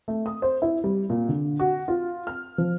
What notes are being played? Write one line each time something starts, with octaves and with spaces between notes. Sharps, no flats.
A3
D#6
C5
E4
G3
A#2
D3
F#4
F4
F6
F3